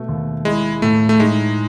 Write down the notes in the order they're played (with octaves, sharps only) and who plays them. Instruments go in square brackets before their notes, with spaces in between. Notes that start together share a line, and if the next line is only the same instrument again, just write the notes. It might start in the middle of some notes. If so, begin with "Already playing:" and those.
Already playing: [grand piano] B2 A3
D#2
[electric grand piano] G#3 [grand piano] E4
[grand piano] A2 [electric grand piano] A3
[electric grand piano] A3
[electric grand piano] G#3 [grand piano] D#4